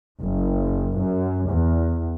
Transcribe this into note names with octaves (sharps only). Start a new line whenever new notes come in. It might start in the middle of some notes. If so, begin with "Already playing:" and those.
F#1
F#2
E2